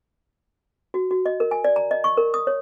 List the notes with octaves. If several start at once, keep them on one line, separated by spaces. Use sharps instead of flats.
F#4
F#4
D#5
A#4
G#5
D5
A#5
D#5
C#6
A#4
D#6
C#5